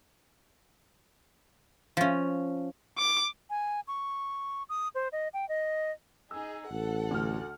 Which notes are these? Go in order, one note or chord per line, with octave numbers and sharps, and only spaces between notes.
F3 C#4
D6
G#5
C#6
D#6
C5
D#5
G5
D#5
D#4 G#4 E6
A1 A4 F#5
D2 F6